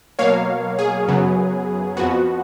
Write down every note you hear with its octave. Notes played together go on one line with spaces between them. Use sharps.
B2 F#3 A#3 C#5 F5
G#4
F#2 C#3 F#3 B3
F2 F3 B3 F#4